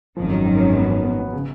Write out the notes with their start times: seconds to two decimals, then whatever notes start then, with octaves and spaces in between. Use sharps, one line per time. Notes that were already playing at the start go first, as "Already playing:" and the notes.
0.17 G#1 F#2 D#3 F3
0.31 F#3
0.46 F#3
0.60 C#4
0.76 B3
0.90 C#4
1.04 B3
1.19 B3
1.33 C#3